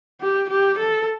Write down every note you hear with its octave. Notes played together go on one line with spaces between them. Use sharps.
G4
G4
A4